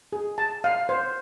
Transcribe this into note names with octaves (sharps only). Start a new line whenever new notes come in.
G#4
A5
F5
C5